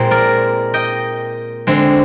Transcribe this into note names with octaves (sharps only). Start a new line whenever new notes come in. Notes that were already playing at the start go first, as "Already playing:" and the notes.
Already playing: A#2 G#3 C4
A#4 D5
D#5 G5
D3 G#3 C4